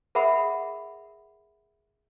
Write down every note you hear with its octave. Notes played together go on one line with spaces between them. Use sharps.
G#4 A#4 E5 F#5 B5 D#6